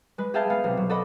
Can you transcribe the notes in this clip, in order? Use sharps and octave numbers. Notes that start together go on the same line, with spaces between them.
G#3 B4
G#4 E5 F5 G5 A5
G#3 B3 F5
B1 C3
F#3
A4 D5 D#5 F#5 B5